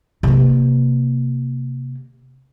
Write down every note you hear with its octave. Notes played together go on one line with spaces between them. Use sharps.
C3 A#3